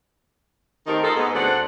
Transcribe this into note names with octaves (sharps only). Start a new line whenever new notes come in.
D#3 A3 C4 D#4 G4 A#4
D#4 F4 G#4 A4
G#2 B3
D2 A3 C4 D5 F#5